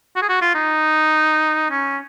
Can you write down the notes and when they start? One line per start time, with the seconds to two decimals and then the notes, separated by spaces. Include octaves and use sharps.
0.16 F#4
0.22 G#4
0.29 F#4
0.42 F4
0.55 D#4
1.70 C#4